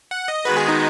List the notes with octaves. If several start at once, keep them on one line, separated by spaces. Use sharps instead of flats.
F#5
D#5
D#3 G#3 B3 F#4 B4
G#4
D#4